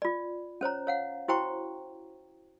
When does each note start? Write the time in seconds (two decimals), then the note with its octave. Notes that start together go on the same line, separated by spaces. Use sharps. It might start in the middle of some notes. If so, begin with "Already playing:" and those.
0.02 F4 D5
0.61 C#4 C5 C#5 A#5
0.87 C#5 F5 F#5
1.28 E4 F#4 C5 G5 A#5 C#6